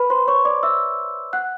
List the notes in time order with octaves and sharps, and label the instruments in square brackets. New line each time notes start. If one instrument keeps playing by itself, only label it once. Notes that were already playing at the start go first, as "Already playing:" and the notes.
Already playing: [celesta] B4 B5
C5 C6
C#5 C#6
D5 D6
E5 E6
F#5 F#6